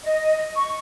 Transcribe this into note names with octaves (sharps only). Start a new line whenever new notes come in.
D#5
C#6